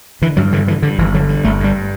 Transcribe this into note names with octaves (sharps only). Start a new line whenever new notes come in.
D3 E3
G2 F#3
D3 E3
D3 E3
G2 D3
G1 E3
D3 F#3
G2
G1 A3
G2 G3